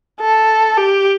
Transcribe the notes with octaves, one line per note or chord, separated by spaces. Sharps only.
A4
G4